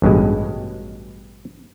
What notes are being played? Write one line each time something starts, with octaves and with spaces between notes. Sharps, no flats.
A1 G2 B2 G#3